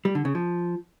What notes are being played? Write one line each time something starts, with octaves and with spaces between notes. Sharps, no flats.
G3
D3
C#3
F3